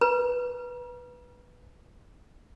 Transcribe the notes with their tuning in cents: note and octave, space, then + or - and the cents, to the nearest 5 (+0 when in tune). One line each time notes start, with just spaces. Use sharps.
B4 -5 A#5 +40